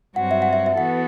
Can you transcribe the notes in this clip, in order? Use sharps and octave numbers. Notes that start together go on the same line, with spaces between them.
G2 F#3 C4 F#4 F#5
E5
F#5
E5
E5
E3 B3 F#4 A4 F#5